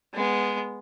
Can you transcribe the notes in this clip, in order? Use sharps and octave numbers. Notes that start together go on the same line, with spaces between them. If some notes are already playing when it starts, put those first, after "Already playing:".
G#3 B3